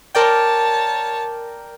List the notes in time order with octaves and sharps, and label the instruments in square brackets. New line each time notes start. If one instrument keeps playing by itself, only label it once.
[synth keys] A#4 D5 G5 [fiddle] C#5 A5